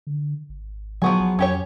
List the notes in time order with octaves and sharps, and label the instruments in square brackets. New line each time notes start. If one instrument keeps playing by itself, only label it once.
[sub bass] D3
G#1
[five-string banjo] F3 B3 G#4 [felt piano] F#3 C#6
[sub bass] A1
[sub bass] F2 [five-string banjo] C#4 G4 C#5